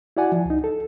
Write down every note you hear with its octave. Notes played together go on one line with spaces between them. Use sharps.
E4 F#4 D5 F#5 G#5
F3
C#2 D#4
A4